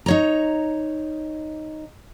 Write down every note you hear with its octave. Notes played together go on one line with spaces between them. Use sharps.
D#4 C#5 A#5